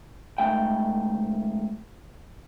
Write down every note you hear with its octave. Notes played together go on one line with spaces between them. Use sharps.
C#2 G#2 E3 A3 G5